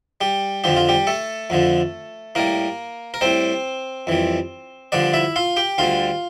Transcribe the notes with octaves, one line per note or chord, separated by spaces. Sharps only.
G3 G4
F2 D3 F3 G4
F4
G3 G4
A3 A4
F2 D3 F3
A2 G3 A#3 A#4
A#4
A2 G3 C4 C5
F2 E3 G3
G2 D3 F3 D4 D5
E4 E5
F4 F5
G4 G5
D2 D3 G3 F4 F5